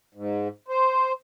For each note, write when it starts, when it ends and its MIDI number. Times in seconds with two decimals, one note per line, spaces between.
0.15 0.48 44
0.68 1.12 72